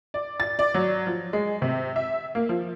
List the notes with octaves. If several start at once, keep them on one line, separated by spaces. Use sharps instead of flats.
D5
A6
D5
F#3
F3
G#3
C3
E5
A#3
F3